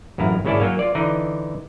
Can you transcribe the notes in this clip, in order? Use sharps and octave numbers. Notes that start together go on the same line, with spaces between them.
A1 F#2 E4 F5 A#5
G#1 C#3 C#4 E4 D5 A5
F#3 A#3 C#4 F5
F4 D5
D3 E3 D#4 D5